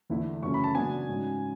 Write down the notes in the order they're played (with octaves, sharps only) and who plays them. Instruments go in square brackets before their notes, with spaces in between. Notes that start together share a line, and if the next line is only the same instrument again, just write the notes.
[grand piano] E2 D3 A3 E4
F#2 C#3 E3 A3 C#4 C#6
B5
A5
C#3 F#3 B3 D4 G#5
G#2 F#3 C#4